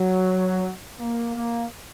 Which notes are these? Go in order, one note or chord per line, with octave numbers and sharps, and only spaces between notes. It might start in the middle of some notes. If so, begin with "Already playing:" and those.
Already playing: F#3
A#3
A#3